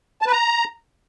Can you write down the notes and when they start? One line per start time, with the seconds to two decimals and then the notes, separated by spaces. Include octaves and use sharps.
0.22 A5
0.27 B4
0.32 A#5